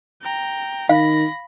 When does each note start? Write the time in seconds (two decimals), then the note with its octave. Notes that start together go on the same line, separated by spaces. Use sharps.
0.22 G5 A#5
0.89 D#3 F5 B5 A#6